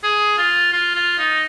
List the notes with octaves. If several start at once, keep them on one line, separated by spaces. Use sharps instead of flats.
G#4
F4
F4
F4
D#4